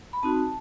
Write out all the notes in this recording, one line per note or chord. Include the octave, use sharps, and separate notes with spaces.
B5
C4 D#4 F#4 A5